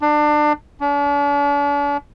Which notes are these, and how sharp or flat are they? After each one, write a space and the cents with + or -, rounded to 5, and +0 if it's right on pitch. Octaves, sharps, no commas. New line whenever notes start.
D4 +25
D4 -45